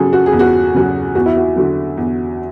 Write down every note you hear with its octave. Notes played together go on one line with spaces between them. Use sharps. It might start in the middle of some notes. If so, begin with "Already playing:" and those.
Already playing: C#3 F#3 G#4 A4
F#4
G#4
E2
F#4
C#3 F#3
E2 F#4
E4
F#4
D3 F#3
E2